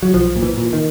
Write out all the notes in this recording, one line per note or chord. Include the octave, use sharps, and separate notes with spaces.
F#3
B1 F3
A#2
E3
A#2
D#3